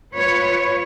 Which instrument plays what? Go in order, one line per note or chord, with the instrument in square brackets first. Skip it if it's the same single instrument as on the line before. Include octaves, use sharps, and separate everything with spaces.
[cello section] F4 B4 C#5